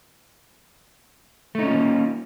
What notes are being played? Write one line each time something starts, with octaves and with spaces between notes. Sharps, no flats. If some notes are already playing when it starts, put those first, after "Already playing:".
A3 A#3 C#4 D#4 F4